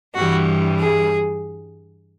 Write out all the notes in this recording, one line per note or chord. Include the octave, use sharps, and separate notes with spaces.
G2 E3 G3 F#4
G#4